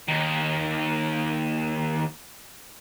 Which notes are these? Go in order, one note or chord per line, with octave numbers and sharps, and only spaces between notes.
D#2 D#3